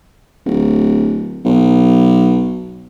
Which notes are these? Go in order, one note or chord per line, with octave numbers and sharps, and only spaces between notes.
D1
B1